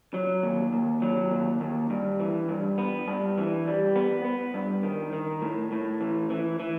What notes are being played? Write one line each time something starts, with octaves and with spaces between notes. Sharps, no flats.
F#3
D#2
D#2
F#3
D#2
D#2
G2
E3
G2
B3
G2
E3
G3
B3
B3
G2
D#3
D#3
A2
A2
E3
E3
E3